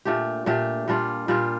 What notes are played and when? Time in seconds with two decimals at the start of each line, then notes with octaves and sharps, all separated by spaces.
0.05 A#2 A3 D4 G4
0.46 A#2 A3 D4 G4
0.88 A#2 G3 D4 F4
1.28 A#2 G3 D4 F4